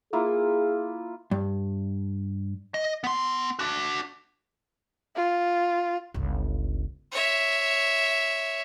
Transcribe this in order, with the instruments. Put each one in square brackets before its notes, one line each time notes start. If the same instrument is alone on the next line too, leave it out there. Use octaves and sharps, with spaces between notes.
[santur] A#3 E4 F4 [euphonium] G#4
[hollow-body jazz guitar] G2
[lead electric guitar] D#5
B3 C6
D4 F#4
[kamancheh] F4
[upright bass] G1 C#2
[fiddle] C#5 E5